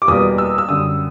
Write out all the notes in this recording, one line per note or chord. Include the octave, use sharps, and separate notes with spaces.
D6
E2 B2 G3 A#3 D#6
E6
E6
F#2 D3 G3 D#6